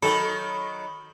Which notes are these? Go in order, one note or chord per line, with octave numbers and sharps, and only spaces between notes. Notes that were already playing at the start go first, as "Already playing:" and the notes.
D#3 F#3 A4 B5